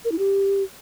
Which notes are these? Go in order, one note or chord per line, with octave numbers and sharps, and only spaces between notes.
A#4
E4
G4